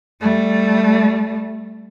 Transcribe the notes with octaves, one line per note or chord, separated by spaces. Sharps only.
G3 A3